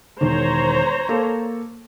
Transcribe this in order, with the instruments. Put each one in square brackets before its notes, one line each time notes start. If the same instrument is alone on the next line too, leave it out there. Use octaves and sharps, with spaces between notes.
[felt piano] E1 D#3 [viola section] C5 C#5 A#5
[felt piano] A#3 A4